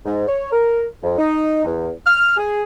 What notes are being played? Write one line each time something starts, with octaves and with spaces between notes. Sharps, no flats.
G#2
C#5
A#4
F2
D#4
E2
F6
G#4